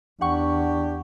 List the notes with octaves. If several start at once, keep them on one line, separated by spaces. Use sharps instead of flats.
E2 D4 G4 F#5 C#6